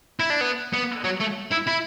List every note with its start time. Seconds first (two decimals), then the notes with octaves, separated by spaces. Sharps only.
0.20 E4
0.30 D4
0.41 B3
0.73 B3
1.04 F#3
1.21 A3
1.52 E4
1.68 E4